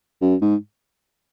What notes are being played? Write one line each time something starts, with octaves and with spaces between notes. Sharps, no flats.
F#2
G#2